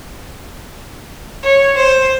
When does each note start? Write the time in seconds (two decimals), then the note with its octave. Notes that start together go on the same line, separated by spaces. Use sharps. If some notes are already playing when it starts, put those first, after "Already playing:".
1.42 C#5
1.76 C5